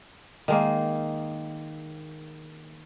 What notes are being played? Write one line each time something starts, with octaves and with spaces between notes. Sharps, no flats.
D#3 G#3 A#3